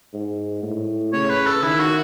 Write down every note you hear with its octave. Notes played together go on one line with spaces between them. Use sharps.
G#2
A2
C#3 C#5
B4
A4
D#3 E4
F#4